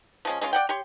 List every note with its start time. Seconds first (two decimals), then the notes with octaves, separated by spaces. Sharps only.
0.25 F3 G#3 C#4
0.41 G#3 A3 C#4 F4
0.53 D5 F#5 G5
0.69 G4 C#5 C6